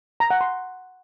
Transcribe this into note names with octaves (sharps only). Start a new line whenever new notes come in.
A#5
F#5
C6